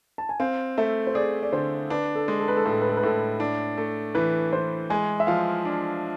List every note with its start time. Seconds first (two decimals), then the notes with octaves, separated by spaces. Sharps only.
0.18 A5
0.29 G#5
0.40 C4 F5
0.78 A3 E5
1.07 C5
1.15 G#4 D5
1.43 D5
1.53 D3 C5
1.90 D4 B4
2.15 A4
2.28 G#3
2.40 A4
2.48 B4
2.57 A4
2.64 A2 B4
2.72 A4
2.81 B4
2.89 A4
2.97 B4
3.03 A2 A4
3.40 D4
3.78 A3
4.15 E3 B4
4.53 E3 C5
4.90 G#3 G#5
5.20 E5
5.27 F3 F5
5.65 D4